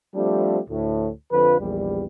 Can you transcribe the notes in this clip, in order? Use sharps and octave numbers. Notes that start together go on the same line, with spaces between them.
F3 G3 A3 C4 D4 G4
D2 A2
F2 D3 F3 B4
A#1 E2 G3